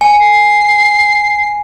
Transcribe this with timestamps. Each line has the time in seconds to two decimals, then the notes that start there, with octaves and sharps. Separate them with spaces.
0.01 G#5 C#7
0.20 C7